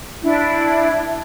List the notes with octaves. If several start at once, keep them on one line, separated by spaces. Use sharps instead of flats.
D4 E4